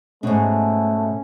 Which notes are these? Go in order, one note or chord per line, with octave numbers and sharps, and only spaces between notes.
G#2 B2 A3 C#4